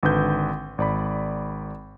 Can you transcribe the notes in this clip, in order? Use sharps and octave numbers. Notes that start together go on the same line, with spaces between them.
G#1 D3 B4 G6
G#1 D5 B5